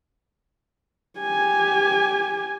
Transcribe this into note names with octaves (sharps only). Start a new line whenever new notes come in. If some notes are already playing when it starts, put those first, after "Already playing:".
G4 G#5